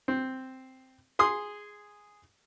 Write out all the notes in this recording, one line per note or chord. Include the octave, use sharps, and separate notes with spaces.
C4
G#4 C6 D#6